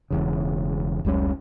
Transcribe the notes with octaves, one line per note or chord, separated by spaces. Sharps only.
E1 E2 C#3
F1 C#2 G3 C#4